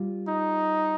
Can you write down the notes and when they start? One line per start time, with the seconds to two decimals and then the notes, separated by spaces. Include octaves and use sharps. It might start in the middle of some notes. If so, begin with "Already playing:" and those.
Already playing: G3 F4
0.28 D#4